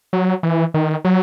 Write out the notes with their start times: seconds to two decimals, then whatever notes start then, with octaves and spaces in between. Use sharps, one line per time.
0.13 F#3
0.43 E3
0.74 D#3
1.05 F#3